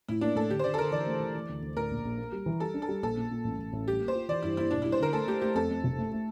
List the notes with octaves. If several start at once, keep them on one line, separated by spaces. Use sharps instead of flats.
A2 E4
A#3 D4
A2 A4
D3 G4
C5
D3 D5
A4
D3 A#4
E3 D5
A3
E3
E3
D2
D2
A2 A#4
A#1
A#1
A#3
G3
E3
G3 A4
D4
A4
G3
A#1 A4
A#2
A#2
A1
A1
A1
G3 G4
A#3
C5
F4
E3 D5
G2 E4
A#3 E4
E1 D4
G3 E4
C5
D3 A#4
A3 A4
A3 G4
A3 G4
F2 A4
F2
F1
A3
A3